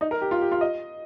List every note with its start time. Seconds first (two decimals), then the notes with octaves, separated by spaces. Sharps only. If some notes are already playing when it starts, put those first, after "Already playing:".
0.01 D#4
0.11 A#4
0.21 G4
0.31 F4
0.41 G4
0.52 F4
0.61 D#5